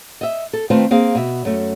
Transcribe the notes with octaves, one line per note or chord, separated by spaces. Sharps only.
D#5 E5
A4
D#3 A3 C4 F4 B4
A#3 C4 G#4 F5
B2 E5
F#2 A3